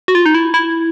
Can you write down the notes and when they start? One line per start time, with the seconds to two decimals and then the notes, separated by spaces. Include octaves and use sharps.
0.08 F#4
0.15 F4
0.26 D#4
0.34 E4
0.54 E4